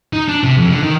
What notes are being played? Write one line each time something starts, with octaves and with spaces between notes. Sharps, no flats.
D#4
D4
C3
F2
D3
D#3